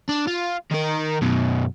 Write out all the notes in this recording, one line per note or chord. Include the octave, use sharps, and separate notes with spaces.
D4
F4
D#3 A#4
F#2 B2